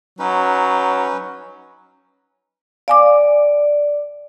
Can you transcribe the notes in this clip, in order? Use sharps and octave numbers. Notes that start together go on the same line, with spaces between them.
F#3 C#4 D#4 B4
D5 F5 G#5 D6